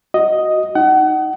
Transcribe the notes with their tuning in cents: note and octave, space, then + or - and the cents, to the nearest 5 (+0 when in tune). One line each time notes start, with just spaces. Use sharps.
F#4 +0 D#5 +0
D#4 +0 F#5 +30